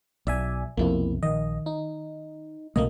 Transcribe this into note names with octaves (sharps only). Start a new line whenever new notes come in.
B1 D5 E5 G#5
B1 F2 C3 A#3 E4
A#1 D#3 D#5
D#4
C2 B2 A3 A#3 D#5